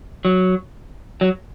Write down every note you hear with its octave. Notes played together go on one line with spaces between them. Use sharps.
F#3
F#3